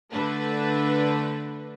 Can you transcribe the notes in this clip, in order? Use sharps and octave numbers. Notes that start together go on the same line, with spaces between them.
D3 A3 D4 B4